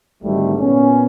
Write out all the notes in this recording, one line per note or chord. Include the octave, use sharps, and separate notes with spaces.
G#1 G#2 D3 G3 A3
A#2 B3 C#4